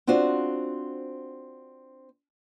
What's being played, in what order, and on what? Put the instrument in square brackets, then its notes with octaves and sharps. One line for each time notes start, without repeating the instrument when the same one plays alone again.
[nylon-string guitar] C4 D4 F4 F#4 C5